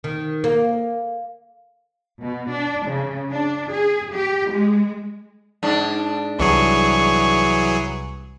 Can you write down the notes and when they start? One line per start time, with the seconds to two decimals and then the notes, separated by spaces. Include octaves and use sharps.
0.04 D#3
0.44 A#3
2.21 B2
2.52 D4
2.88 C#3
3.31 D4
3.72 G#4
4.13 G4
4.52 G#3
5.63 G#2 D4
6.39 C2 E3 F#3 G#4 C#6